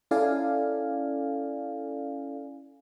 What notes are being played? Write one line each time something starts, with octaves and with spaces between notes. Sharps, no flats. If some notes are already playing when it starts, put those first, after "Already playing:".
C#4 E4 A4 D5 F5 G#5